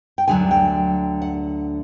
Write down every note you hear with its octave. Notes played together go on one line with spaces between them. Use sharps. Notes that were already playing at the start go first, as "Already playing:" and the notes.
G5
D2 D3 F#3 G#5
G5
F#5